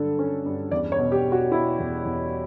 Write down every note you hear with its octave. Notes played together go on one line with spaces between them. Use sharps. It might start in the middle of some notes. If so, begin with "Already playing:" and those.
Already playing: G2 D3 F#3 A4
C#4
G2
E2 D5
C#5
B2
G4
B2
F#4
B2 E4
E2
E2